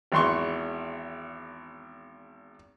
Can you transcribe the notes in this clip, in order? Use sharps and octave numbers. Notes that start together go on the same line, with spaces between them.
G#1 E2 C6 C#6